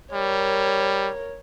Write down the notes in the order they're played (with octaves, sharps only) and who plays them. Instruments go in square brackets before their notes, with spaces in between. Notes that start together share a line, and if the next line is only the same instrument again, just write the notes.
[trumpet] G3 [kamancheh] A#4 C#5